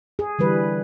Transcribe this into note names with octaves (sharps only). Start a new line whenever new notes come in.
G#4
D3 E3 G3 B4